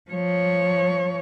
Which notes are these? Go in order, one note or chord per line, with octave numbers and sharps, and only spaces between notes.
F3 C#5